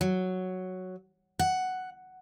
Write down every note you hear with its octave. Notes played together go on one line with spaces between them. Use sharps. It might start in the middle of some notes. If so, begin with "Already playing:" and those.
F#3
F#5